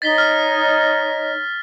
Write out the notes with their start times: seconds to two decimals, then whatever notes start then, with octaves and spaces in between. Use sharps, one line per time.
0.02 D#4 C#5 D#5 A6 B6 G7
0.18 F6